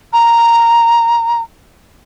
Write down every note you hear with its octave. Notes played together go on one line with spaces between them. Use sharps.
A#5